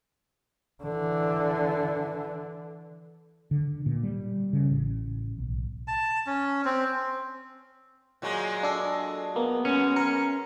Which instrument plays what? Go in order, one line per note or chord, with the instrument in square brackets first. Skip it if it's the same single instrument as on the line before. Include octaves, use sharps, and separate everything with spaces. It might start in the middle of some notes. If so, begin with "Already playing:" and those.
[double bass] D3 E3
[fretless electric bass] D3
A#2
G3
C#3
A1
B1
[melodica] A5
C#4
C4
[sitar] A#2 F#3 G#3
[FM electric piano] D4 A4
[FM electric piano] A#3 [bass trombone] B3
[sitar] F#2 [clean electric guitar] C#4
[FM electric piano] A#4 C#7